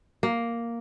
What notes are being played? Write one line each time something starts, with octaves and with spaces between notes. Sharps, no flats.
A#3